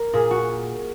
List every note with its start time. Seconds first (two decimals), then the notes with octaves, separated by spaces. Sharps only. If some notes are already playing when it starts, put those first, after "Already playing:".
Already playing: A#4
0.13 A#2 G#4
0.31 F#4